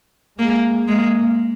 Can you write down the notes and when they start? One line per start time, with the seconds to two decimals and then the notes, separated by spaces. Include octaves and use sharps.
0.39 G#3 A#3
0.88 G#3 A#3